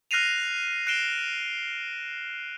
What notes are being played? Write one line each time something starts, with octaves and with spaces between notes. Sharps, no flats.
F6 F#6 A#6 C7 D#7 F7
F#6 C7 D7 E7 G7